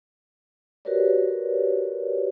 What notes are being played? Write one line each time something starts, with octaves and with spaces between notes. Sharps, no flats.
F#4 G4 A#4 B4 C#5 D5